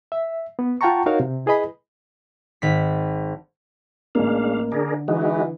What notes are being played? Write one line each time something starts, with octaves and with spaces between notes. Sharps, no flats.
E5
B3
F4 F#5 G5 A5 A#5 C#6
D#4 F#4 A#4 C#5 F5
C3
E4 G#4 B4 D#5 B5
G#1 B6
A1 G#3 A#3 D4 F5
D3 D4 G#4 A#4
E3 G#3 D#4 F#4